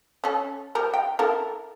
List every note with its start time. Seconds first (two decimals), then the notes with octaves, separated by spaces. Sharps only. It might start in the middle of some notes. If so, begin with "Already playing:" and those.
0.24 C#4 A4
0.75 F3 G3 A#4
0.94 G5
1.19 E4 A4 A#4